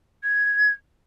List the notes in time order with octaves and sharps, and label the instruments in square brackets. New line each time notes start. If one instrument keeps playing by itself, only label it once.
[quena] G#6